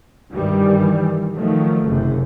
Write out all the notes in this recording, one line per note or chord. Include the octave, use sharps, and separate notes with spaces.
G2 D#3 E3 G3
D#3 F3 F#3 A3
F#1 F#2 C3